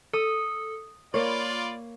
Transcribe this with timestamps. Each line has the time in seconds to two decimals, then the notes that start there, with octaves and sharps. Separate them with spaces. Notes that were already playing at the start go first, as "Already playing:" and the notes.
0.13 A4 D#6
1.14 A#3 F4 C#5 D5 B5